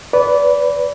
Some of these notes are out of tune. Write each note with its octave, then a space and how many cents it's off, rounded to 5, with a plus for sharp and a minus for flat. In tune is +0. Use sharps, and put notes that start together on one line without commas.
B4 +0 D5 -25